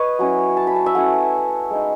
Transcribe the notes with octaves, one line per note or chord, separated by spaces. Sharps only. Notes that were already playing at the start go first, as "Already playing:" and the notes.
Already playing: B4 C#5 D#5
F#3 C#4 E4
A5
B5
A5
E5
A3 C#4 E4 F#5
G#3 D#4